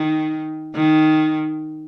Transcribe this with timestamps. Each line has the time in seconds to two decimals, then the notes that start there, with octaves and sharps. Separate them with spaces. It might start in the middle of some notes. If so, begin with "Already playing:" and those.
Already playing: D#3
0.75 D#3